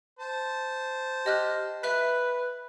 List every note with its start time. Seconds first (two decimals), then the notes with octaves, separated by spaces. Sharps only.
0.19 C5 A5
1.26 G4 D#5 F6 F#6
1.83 B4 E5 F#6 B6